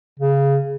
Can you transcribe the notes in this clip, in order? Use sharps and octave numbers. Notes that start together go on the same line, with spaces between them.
C#3